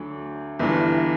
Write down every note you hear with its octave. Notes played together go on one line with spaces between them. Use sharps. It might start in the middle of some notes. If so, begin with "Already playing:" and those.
Already playing: D2 F#3 A3 D4
G1 G2 E3